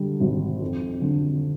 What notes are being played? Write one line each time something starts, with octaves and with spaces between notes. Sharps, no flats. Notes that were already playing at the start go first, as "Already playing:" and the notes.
Already playing: D3 G3
G#1
F2
D3